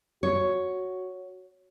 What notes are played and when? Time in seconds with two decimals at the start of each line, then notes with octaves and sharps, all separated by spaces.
0.23 F#4 C#5